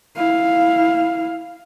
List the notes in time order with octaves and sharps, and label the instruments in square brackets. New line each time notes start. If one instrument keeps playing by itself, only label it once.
[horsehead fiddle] E4 F5